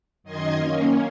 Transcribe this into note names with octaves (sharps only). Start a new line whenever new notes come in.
F#2 D#3 D#5 C6 G#6
A#3 C#4